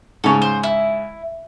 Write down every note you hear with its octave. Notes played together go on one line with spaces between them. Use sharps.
G#2 C#3 A4 C#5
C5
E4